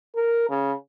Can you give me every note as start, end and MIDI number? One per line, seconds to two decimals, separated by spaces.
0.15 0.45 70
0.50 0.73 49